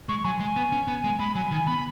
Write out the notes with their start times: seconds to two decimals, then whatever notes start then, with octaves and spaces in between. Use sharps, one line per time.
0.09 G#3 C#6
0.25 F#3 G#5
0.40 G#3 G#5
0.56 B3
0.72 C#4
0.88 B3
1.04 G#3
1.19 G#3 B5
1.35 F#3 G#5
1.51 D#3 G#5
1.67 B3 B5